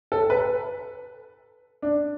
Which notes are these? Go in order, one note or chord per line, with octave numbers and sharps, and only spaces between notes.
A4
B4
D4